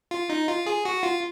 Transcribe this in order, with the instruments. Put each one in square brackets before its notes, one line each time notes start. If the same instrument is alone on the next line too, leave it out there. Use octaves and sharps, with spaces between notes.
[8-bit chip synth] F4
D#4
F4
G#4
F#4
F4